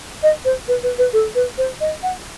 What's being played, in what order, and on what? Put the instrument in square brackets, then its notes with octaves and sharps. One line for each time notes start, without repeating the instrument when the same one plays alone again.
[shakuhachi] D#5
C5
B4
B4
B4
A4
B4
C5
D#5
F#5